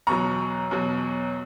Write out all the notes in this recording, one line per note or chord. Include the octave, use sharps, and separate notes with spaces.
E2 B2 F#3 A#5 C#6
E2 B2 F#3